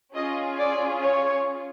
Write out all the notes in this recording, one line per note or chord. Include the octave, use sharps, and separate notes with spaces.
C#4 F4 G#4 D#5
D5
C#5